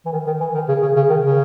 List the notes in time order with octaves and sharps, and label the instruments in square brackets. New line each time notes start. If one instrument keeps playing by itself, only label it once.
[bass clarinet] E3
D#3
D#3
E3
D#3
C#3
C#3
C#3
D#3
C#3